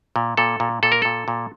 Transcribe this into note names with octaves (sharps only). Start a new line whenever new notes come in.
A#2
A#2 A4
A#2
A#2 A4
A#4
A#2 A4
A#2